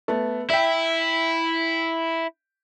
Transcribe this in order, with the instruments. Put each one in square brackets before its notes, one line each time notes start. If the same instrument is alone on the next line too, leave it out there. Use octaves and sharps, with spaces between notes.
[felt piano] A3 B3
[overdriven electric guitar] E4 [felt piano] E5 G5